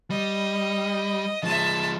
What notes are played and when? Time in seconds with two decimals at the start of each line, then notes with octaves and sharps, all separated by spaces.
0.10 G3 D#5
1.44 F3 G#3 E5 A5